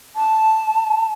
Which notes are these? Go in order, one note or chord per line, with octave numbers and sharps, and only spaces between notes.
A5